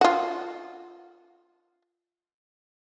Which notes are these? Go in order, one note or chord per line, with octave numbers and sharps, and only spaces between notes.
F4 F#4